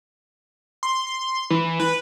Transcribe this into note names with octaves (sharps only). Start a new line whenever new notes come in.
C6
C6
E3
B4